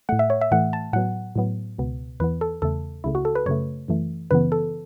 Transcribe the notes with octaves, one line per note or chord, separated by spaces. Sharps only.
A2 A3 F#5
E5
C#5
E5
A2 E3 A3 F#5
A5
A2 F#3 B3 F#5
A2 F#3 B3
C#2 B2 B3
E2 E3 B3 B4
A4
E2 C#3 A3 A4
C#2 C#3 A3 E4
F#4
A4
B4
F#2 C#3 A3 C#5
F#2 E3 A3
F#2 C#3 E3 B3 B4
A4